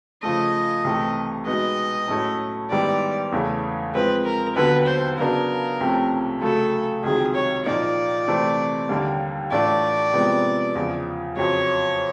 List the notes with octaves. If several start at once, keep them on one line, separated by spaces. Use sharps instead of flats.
C#3 F3 A3 D#5
C2 C3 E3 A3
B2 G#3 B3 D#4 D#5
A2 F#3 A3 C#4 E4
G#2 D#3 G3 B3 E4 D5
E2 C#3 E3 A3 C#4
F3 G#3 C4 B4
A#4
D#2 D3 F#3 B3 B4
C5
C#3 F#3 B3 D4 A#4
C2 C3 F3 A3 C#4
C#3 F#3 A3 A4
C#2 C3 D#3 F#3 G#4
C#5
A#2 F3 A#3 D#4 D5
C3 E3 A3 C4
D#2 D3 G3 A#3
A2 E3 A3 D4 F4 D5
C3 F3 G#3 B3 E4
E2 C#3 F3
F2 C#3 F#3 C#5